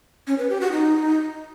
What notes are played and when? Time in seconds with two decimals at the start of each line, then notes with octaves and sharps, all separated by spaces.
0.27 C#4
0.38 B4
0.50 G4
0.61 F#4
0.72 D#4